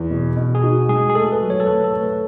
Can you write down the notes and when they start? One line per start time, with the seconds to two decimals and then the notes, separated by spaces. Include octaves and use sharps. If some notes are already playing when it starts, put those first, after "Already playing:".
Already playing: E2 G#4
0.10 B2
0.36 B2
0.55 G#4
0.63 D#4 F#4
0.89 G#3 G#4
1.10 G#4
1.15 A3 A4
1.32 B4
1.41 F#3
1.50 C#5
1.60 A4
1.66 A3 B4
1.84 A4
1.93 A3
2.02 B4